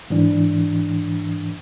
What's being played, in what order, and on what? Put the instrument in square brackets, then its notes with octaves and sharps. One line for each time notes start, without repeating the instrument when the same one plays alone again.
[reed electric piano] G#2 E3 D4